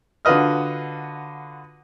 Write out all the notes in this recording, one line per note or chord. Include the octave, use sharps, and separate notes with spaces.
D3 F4 F#4 B4 D#5 F6